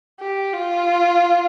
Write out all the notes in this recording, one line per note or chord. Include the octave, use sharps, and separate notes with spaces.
G4
F4